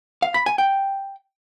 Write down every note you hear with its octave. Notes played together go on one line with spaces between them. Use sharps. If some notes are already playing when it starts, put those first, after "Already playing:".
F5
B5
G#5
G5